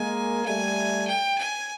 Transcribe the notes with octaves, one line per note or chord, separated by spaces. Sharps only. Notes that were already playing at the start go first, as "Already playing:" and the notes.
Already playing: G#3 A#3 G#5
G3 A3 G#5
G5
G#5